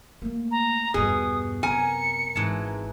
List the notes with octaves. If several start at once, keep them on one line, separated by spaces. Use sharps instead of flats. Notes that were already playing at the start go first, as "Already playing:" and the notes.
A3 A#3
A#5
E2 G2 B2 G#4 D#6
F#2 C3 A#4 G#5 C#7
G#1 G#2 E3 A5